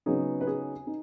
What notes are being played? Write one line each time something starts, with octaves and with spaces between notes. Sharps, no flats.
C#3 F#3 B3 D#4 G#4
B4
G#4
D#4